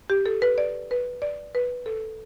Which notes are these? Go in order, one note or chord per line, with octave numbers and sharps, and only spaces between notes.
G4
A4
B4
D5
B4
D5
B4
A4